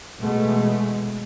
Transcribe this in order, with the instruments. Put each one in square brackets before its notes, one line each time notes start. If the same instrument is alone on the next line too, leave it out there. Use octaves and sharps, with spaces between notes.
[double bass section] B2 E3 G#3 A3